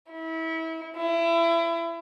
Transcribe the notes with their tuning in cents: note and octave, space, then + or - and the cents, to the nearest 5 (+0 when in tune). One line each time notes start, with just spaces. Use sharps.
E4 -30
E4 +25